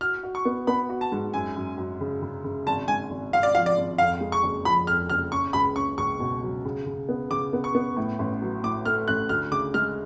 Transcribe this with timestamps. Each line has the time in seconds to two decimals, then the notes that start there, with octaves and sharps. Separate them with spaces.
0.01 F#4 F6
0.23 F#4
0.35 C#6
0.45 B3
0.67 B3 B5
0.89 F#4
1.01 A5
1.12 G#2
1.34 F#2 G#5
1.56 F#2
1.77 F#2
2.00 C#3
2.22 C#3
2.44 C#3
2.66 G#1 A5
2.88 G#2 G#5
3.10 G#1
3.33 G#1 F5
3.43 D5
3.55 F3 F5
3.66 D5
3.77 G#1
3.98 F2 F5
4.21 G#3
4.32 C#6
4.43 F#1
4.65 F3 B5
4.87 F2 F6
5.09 F#1 F6
5.32 C#4 C#6
5.53 C#2 B5
5.76 C#4 C#6
5.98 C#2 C#6
6.20 B2
6.43 F#3
6.65 C#3
6.86 C#3
7.09 B3
7.31 C#3 D6
7.53 B3
7.64 C#6
7.75 B3
7.97 A2
8.19 A1
8.41 F#3
8.63 A2 D6
8.86 A3 F6
9.08 A1 F#6
9.29 D2 F6
9.51 C#3 D6
9.74 G#3 F6